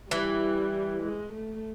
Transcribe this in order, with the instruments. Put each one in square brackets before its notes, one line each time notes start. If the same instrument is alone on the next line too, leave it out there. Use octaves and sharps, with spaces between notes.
[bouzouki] E3 [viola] G3
[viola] G#3
A3